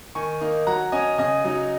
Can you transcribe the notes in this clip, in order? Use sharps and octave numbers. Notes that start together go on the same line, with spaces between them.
D#3 G#5 C#6
A#3 D#4
F#3 F#5 A#5
C#4 D#5 G#5
C#3 D#5 G#5
F#3 D#4